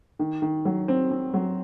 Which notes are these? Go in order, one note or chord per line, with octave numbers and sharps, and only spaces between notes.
D#3
D#3
F#3
C4
C4
F#3